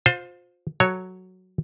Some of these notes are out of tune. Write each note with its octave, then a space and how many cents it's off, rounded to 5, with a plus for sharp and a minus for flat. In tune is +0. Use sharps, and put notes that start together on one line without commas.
F4 +30 C5 +0
F#3 +0 A4 +0 C#5 +0